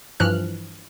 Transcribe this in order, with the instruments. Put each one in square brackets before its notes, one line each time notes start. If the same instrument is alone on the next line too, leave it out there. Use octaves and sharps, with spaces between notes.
[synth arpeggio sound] G2 E3 F3 F6 F#6